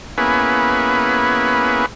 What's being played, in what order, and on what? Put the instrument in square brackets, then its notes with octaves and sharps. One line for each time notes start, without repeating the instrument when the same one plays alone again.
[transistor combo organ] A#3 B3 C#4 E4 G#4 B4